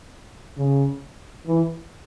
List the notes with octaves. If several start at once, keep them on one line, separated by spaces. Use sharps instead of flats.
C#3
E3